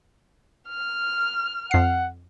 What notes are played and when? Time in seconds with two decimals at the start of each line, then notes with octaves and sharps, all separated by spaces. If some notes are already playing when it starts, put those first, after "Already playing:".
0.68 F6
1.71 F2 F#5 C7